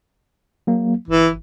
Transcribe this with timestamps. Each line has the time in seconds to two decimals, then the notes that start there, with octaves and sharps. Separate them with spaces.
0.67 F#3 A#3
1.08 G1 E3